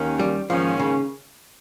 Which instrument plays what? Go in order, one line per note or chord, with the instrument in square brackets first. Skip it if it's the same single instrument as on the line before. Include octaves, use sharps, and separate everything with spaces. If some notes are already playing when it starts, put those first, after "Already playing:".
Already playing: [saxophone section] D#2 D#3 A#3 C#4
[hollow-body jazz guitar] G3
[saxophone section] G#2 D#3 A#3 C#4 [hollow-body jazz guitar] F3
[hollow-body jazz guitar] C#3